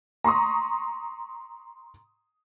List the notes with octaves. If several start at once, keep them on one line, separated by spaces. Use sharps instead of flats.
A#5 C6 C#6 D#6